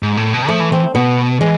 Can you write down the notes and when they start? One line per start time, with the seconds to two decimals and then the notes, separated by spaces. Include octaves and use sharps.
0.03 G#2
0.17 A2
0.34 B2
0.49 F3 A3
0.60 E3
0.72 E3 C4
0.95 B2 B3
1.40 E3 G#3